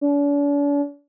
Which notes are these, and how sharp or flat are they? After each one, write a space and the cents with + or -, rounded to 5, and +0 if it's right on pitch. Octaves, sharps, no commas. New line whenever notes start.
D4 -45